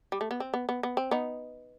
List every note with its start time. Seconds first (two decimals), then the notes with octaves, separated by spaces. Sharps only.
0.12 G3
0.21 A3
0.31 B3
0.40 C4
0.54 B3
0.69 B3
0.83 B3
0.97 C4
1.11 B3 D#4